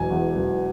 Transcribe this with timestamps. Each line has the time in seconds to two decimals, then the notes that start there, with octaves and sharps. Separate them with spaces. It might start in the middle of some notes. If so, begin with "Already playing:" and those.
Already playing: E1 G#5
0.10 E2
0.37 E1